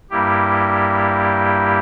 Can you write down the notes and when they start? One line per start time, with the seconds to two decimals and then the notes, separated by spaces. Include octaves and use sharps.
0.10 G2 G3 A#3 E4 G4